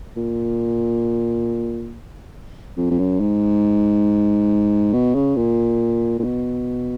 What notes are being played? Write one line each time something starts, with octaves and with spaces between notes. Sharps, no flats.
A#2
F2
F2
F#2
G#2
B2
C#3
A#2
A#2
B2